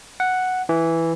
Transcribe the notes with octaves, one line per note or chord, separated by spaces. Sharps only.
F#5
E3